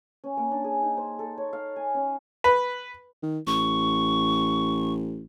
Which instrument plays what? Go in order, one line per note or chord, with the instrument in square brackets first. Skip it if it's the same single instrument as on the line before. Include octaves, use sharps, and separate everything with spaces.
[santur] C#4
A#3
D4
G#4
D#4
C5
A4
C#5
F5
G#5
C#4
[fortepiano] B4
[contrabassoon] D#3
[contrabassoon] A1 [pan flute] C#6